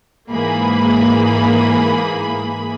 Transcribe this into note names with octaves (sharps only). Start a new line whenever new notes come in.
G#2 E3 A#3 G#4 B5